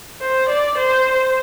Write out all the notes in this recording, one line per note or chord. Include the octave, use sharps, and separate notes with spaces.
C5
D5
C5